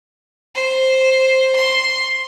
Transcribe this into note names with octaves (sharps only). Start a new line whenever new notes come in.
C5
C6